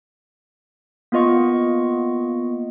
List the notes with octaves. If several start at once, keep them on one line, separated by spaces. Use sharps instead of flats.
A#3 B3 F4 D#5 C#6